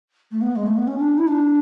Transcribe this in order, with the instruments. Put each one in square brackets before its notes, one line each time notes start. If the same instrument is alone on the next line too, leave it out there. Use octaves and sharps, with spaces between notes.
[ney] A3
B3
G#3
A3
B3
C#4
D4
E4
D4